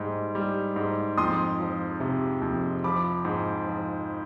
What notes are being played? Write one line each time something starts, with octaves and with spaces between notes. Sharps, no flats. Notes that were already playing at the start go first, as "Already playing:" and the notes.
Already playing: G#2 G3
G3
G#2
F2 C6 D#6
F3
C3
F2
F3 B5 D6
G#2
F3